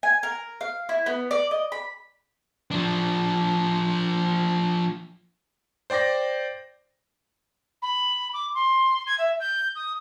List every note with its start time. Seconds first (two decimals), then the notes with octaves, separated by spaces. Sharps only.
0.03 G#5
0.23 A#4
0.61 F5
0.89 E4
1.06 B3
1.31 D5
1.51 D#5
1.72 B5
2.71 F3 D4
5.90 C5 D5 G5 D6 A#6
7.82 B5
8.34 D6
8.55 C6
9.07 G#6
9.18 E5
9.40 G6
9.75 D#6